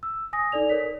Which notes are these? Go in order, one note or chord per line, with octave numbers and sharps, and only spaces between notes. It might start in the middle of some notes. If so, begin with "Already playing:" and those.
E6
G#5 D#6 A#6
D#4 A4 D5 F7
A#4 C#5 B6